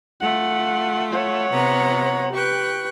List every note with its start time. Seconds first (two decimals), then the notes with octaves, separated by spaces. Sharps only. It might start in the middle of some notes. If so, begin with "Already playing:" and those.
0.21 A3 F4 F#5
1.12 C#5 F#5
1.51 C3 B3 A#5
2.33 G4 B4 G5 C#6 F#6